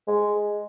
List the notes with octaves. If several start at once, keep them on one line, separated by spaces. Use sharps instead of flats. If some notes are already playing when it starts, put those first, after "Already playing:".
G#3